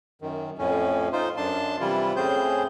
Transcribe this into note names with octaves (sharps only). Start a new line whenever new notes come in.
F#2 D#3
F2 A2 C#4
D#4 F4 C5
F#2 D4 A5 C6
C3 E3 G3 E4 F4
A2 C4 C#4 G#4 C5 G6